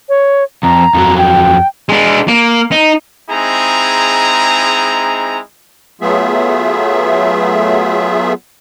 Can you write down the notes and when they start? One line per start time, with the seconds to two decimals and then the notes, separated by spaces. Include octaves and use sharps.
0.09 C#5
0.63 F2 A#5
0.94 F2 F#3
1.18 G5
1.89 G#3 D4
2.28 A#3
2.72 D#4
3.31 G#3 C4 D#4 E4 G#4 A#5
6.01 F#3 A3 B3 F4 G#4 E5